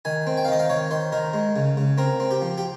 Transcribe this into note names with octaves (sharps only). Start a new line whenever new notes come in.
D#3 G#5
C4
G5
F5
D#3 D#5
F5
D#3 C#5
D#3 C5
D#3 A#4
G#3
C#3
C#3
C4 A#4
C4
G4
F3
G4